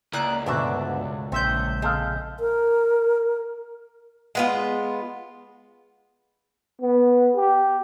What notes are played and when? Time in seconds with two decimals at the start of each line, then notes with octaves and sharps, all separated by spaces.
0.13 C#2 A#3 E4 D5 D#6 F#6 D7
0.46 D2 G2 B2 D3 D4 F#4 D5 E5
1.32 A#1 D3 A3 C4 E5 G6
1.82 G#3 C4 A4 F5
2.40 A#4
4.35 G#3 B3 F4
6.81 B3
7.36 G4